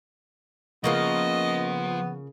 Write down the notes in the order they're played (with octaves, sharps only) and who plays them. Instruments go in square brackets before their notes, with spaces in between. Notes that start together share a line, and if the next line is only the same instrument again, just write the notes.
[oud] C#3 A#3 F4 [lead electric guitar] F3 [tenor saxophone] B3 [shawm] D#5